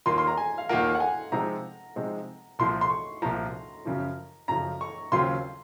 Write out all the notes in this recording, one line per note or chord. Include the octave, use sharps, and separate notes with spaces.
D#2 D#3 A#3 F4 A#4 C6
C6
A#5
G#5
F5
D#2 D#3 A#3 F4 A#4 F#5
F#5
G#5
C3 F3 G#3 C4 D#4 A#5
C3 F3 G#3 C4 D#4
C2 A#2 F3 C6
C6
C#6
C2 A#2 F3 A#5
F#2 C#3 F3
F#2 C#3 F3 A#5
C#6
D#2 C#3 F#3 C4 F4 C6